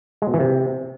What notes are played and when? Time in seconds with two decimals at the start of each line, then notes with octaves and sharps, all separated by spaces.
0.22 G#3
0.28 B2
0.34 E3
0.40 C3